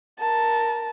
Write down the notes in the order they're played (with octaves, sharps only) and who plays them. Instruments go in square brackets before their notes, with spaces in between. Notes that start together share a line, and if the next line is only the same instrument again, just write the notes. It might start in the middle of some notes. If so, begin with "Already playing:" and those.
[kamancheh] A#4 A5